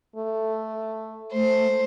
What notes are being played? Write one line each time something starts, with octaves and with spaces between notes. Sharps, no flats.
A3
A3 C5